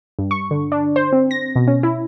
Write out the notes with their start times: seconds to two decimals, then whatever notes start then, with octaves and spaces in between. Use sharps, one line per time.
0.19 G2
0.31 C#6
0.51 D3
0.72 D4
0.96 C5
1.13 C4
1.31 A#6
1.56 B2
1.67 C#4
1.83 E4